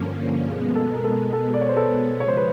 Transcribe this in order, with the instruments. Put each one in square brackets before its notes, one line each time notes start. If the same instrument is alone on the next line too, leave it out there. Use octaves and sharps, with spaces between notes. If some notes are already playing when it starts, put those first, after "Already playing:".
Already playing: [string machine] G2 D3 F3 A#3 C#4
[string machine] B2 G#3 B3 [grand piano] G#4
[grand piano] A4
A#4
A4
A4
D5
C#5
C5
A4 B4
[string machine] C#3 F3 G#3 [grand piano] C#5
[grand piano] C5
B4